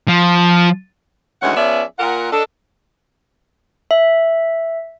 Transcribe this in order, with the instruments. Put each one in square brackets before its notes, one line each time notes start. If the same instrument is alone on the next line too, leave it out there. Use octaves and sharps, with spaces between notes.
[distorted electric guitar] F3
[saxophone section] D2 D#3 E3 G#3 C#4 F#5
F3 B3 C#4 G#4 D5 E5
A#2 F4 A#4 F#5
D4 A4 D#5
[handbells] E5